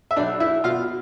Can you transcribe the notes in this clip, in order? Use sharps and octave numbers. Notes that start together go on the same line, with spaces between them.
E5
B1 D4 D5
E4 E5
B2 F4 F5